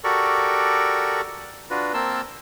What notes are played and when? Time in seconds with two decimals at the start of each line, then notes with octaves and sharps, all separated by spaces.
0.04 F#4 G4 A4 A#4 D5 C#6
1.70 D4 F4 F#4 B4
1.94 A#3 C4 A#4 A5 C6 E6